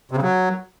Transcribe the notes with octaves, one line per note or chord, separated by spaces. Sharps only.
C3
C#3
F#3